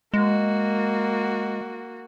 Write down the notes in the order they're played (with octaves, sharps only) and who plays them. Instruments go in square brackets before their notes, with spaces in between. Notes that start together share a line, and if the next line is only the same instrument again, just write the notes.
[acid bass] G#3 [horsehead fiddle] A#3 F#4